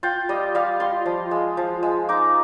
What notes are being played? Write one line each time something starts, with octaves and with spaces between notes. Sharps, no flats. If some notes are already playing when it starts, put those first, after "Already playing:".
F4 G5
G3 D#5
G3 F5
F4 C6
F3
G#3
F3
G#3
D#4 D6